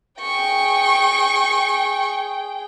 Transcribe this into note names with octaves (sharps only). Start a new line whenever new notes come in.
G#4 G5 C#6